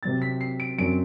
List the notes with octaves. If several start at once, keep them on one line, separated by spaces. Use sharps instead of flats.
C3 F#3 C4 A6
B6
C7
D7
F#2 F#3 C4 D7